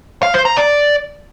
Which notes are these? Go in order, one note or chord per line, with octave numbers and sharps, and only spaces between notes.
F5
C5
A#5
D5